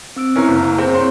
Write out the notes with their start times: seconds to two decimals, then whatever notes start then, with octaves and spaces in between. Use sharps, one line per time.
0.16 C4 E6 D7
0.36 B3 C#4 E4 A#4 A#5
0.48 F#1
0.78 C4 G#4
0.95 C4 G#4 C#5 C6